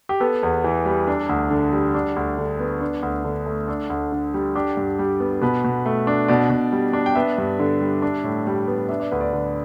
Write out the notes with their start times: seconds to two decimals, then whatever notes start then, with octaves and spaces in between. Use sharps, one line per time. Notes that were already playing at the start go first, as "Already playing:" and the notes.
0.09 G4
0.20 B3 A4
0.43 E2
0.64 E3
0.86 G3
1.08 D4
1.29 D2
1.50 D3
1.73 G3
1.95 D4
2.16 D2
2.38 D3
2.60 B3
2.81 D4
3.02 D2
3.25 D3
3.46 A3
3.68 D4 A4
3.90 D2
4.12 D3
4.34 G3
4.55 D4 G4
4.77 G2
4.99 G3
5.20 B3
5.41 B2 B4
5.64 B2
5.86 A3
6.07 D4
6.28 B2 D5
6.50 B2
6.72 G3
6.93 D4
7.06 G5
7.15 B3 E5
7.38 G2
7.59 D3
7.81 G3
8.02 D4
8.24 A2
8.47 G3
8.68 B3
8.89 D4 E5
9.00 D5
9.11 D2 B4
9.21 D5
9.33 D3